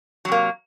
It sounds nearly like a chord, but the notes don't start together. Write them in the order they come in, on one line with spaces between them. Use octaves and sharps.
F#3 C3 A#3